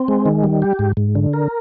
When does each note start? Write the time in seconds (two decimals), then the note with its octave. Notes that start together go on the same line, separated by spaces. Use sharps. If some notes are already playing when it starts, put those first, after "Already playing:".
Already playing: C4
0.08 G#3
0.26 D#3
0.44 G3
0.62 G4
0.79 G#2
0.97 G#2
1.15 D3
1.34 A#4